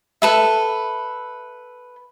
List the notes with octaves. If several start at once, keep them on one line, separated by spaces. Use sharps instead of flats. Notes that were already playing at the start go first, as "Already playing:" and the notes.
A4 B4 E5